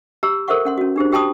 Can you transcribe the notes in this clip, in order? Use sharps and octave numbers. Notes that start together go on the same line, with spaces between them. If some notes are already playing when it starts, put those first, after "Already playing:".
G4 A#5 C6 E6
A4 A#4 C5 E5 F#5 C#6
C#4 F#5 C6
C#4 F#4
D4 G4 G#4 C5
F#4 G4 G5 A5 C6 D#6